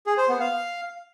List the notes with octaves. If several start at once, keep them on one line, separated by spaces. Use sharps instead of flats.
G#4
C5
B3
F5